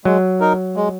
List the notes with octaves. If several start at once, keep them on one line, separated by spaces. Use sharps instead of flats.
F#3 G#3
D#4 A#4
G#3